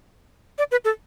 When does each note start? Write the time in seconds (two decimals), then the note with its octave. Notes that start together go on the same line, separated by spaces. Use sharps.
0.58 D5
0.71 B4
0.85 A4